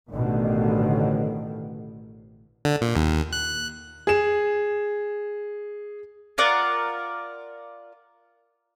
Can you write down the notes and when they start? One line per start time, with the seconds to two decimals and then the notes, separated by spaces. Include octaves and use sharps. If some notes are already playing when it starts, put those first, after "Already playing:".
0.11 A1 B2 D3 D#3
2.65 D3
2.81 A#2
2.96 D#2
3.33 F#6
4.07 G#4 E7
6.38 F4 A#4 D5 F#5